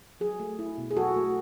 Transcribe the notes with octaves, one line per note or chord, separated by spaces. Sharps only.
F#3 G#4
A3
E4
B2
G#4
F#3 F#4 A4
A3